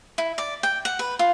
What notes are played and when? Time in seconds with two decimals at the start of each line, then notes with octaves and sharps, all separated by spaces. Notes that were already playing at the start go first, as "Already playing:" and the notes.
0.18 E4
0.38 D5
0.63 G5
0.85 F#5
0.99 B4
1.19 F4